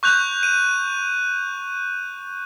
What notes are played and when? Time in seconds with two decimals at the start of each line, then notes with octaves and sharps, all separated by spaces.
0.03 C#6 F#6 G6 F7
0.43 D#7